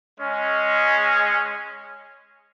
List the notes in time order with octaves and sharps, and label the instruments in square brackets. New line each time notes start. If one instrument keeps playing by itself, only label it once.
[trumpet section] G#3 C#4